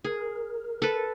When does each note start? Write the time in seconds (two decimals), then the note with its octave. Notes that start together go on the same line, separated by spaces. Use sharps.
0.04 G#4 A#4
0.82 A4 B4